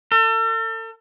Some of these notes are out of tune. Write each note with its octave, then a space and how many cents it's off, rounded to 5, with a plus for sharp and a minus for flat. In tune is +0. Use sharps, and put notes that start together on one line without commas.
A4 +40